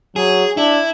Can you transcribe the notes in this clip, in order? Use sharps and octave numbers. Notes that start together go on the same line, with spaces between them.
F#3 G#4
D4 E4